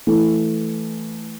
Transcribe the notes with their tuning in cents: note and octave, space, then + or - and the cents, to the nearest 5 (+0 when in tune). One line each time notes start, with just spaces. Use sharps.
E3 +0 A3 +0